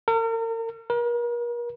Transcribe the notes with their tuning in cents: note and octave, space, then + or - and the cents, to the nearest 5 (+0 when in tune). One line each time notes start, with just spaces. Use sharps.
A#4 -40
A#4 +40